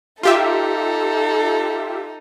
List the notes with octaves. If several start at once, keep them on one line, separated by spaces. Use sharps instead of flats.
D#4 F4 G4 A4 E5